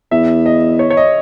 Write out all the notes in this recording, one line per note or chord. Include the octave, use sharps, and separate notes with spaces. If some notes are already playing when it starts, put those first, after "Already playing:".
E2 E5
D#5
C#5
C#5
D#5